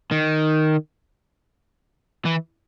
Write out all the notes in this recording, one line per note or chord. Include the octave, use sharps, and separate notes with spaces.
D#3
E3